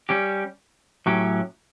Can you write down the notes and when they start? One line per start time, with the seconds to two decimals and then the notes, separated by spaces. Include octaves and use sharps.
0.09 G3 C#4 G4
1.06 A2 F#3 C#4 G4